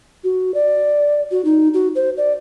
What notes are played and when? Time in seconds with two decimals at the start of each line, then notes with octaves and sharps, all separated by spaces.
0.24 F#4
0.54 D5
1.31 F#4
1.45 D#4
1.74 F#4
1.95 C5
2.17 D5